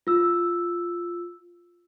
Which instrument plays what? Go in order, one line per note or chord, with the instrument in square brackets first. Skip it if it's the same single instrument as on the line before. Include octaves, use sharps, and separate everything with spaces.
[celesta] F4 E6